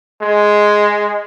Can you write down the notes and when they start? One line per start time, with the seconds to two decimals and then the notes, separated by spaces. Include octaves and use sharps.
0.22 G#3